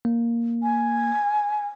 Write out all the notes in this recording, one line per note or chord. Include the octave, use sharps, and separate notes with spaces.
A#3
G#5